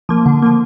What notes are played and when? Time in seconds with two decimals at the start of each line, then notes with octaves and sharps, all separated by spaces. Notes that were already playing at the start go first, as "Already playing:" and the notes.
0.09 F3 A#3
0.26 D3
0.42 F3 A#3